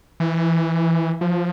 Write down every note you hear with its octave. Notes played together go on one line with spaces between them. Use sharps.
E3
F3